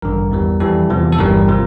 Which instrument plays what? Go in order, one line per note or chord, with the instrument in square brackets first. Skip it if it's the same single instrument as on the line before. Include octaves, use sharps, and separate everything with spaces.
[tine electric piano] A1 G2 D3 A#4
E2 E3 G3
F2 E3 G3 A4
E2 C3 F3
A4
G1 G2 E3 G3 A#4
C3 F3